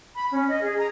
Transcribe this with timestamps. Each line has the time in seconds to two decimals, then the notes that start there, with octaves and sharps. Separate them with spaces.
0.16 B5
0.32 C#4
0.49 D#5
0.62 G#4
0.78 A#5